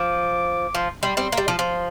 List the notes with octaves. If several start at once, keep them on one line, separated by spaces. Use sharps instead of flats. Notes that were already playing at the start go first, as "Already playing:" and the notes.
Already playing: F3 D6
F3 C6
G3 C6
G3 C4 C6
A#3
G3
F3
F3